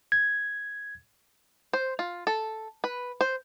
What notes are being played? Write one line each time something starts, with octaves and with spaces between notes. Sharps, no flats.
G#6
C5
F4
A4
B4
C5